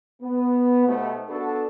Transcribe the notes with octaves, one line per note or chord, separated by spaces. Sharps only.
B3
B2 A3 B3 D#4 G4 C5
B3 D4 F#4 A4